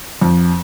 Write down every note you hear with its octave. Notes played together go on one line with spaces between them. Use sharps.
F2